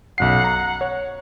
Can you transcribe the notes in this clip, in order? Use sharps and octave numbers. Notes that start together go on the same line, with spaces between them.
B1 F#2 F#5 C7
A#5
C#5